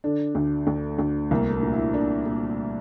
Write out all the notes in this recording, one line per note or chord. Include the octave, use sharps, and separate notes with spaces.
D3 D4
D2
D2
D2
C2 A#3
A#3
A#2
E4
A#2 D4
A#2